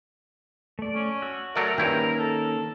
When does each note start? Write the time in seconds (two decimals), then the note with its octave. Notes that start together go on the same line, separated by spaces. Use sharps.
0.79 A3 D5
0.95 C#4
1.22 F#4 E6
1.56 F#3 A3 A#4 D5
1.78 G2 D#3 A#3 C#4 E4 G5
2.19 A4